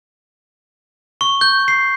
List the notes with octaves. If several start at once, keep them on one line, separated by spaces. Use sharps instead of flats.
C#6
G6
C7